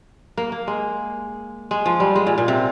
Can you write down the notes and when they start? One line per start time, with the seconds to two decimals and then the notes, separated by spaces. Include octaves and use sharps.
0.37 A#3
0.52 A#3
0.67 G#3
1.71 G#3
1.86 F3
2.00 G3
2.16 G#3
2.27 A#2
2.38 A#2
2.48 C3